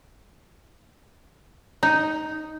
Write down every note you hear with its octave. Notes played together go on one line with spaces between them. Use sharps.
D#4